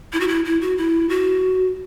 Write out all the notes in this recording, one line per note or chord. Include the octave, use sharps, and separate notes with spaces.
E4
F#4
E4
E4
F#4
E4
F#4